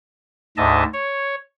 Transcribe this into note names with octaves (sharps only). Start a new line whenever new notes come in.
D2 G#2 D#5 E5 A5
C#5